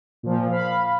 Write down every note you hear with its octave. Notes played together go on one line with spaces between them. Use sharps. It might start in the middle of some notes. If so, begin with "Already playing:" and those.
A#2 F3
F5 B5